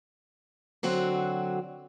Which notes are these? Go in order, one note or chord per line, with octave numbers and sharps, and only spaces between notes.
D3 F#3 C4 F#4